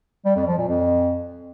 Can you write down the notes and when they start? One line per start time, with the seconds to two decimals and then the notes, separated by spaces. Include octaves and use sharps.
0.25 G3
0.36 F2
0.47 F3
0.58 A#2
0.69 F2